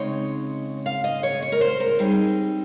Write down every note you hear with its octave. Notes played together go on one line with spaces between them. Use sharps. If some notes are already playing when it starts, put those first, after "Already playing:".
Already playing: C#3 G#3 C4 D#4 C#5
F5
D#5
C#5
C#5
A#4
C5
A#4
G3 C4 D#4 G#4